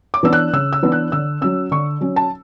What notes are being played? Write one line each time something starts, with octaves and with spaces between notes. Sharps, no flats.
D6
E3 B3 D4 E6
F#6
C#3 E6
E6
E3 B3 D4
F#6
D3 E6
F#3 C#4 E6
D3 C#6
F#3 C#4
A5